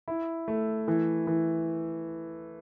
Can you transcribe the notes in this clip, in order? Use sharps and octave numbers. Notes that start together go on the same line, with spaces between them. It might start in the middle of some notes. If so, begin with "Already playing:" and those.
E4
A3
E3
E3